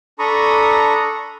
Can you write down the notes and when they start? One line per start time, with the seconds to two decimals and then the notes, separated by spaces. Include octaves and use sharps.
0.19 D4 A4 A#5 B5 C#6 D#6